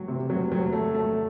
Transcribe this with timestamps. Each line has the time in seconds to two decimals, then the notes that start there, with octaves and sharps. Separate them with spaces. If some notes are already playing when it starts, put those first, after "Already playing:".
Already playing: F#3
0.08 C3
0.30 F#3
0.52 F#3
0.73 A3
0.94 A3